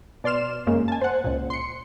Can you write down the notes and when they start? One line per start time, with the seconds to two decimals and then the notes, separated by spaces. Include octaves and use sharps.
0.24 B2 D5 C6 F6 E7
0.67 F#2 C#3 G#3 A#3
0.88 G#5 A5
1.01 C5 F#5
1.24 C#2 A#2
1.50 C6 C#7